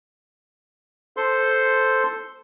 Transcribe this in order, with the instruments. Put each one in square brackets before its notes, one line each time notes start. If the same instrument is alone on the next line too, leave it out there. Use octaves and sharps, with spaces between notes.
[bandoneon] A4 C5 C6